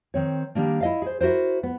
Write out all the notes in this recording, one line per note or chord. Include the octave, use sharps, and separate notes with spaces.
D#3 C4 C#5
D#3 G3 A#3 D4
E4 D#5 F5
G#4 C5
E4 F#4 A#4 C5
B3